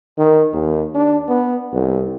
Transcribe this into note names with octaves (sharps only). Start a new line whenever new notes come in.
D#3
D#2
D4
B3
C2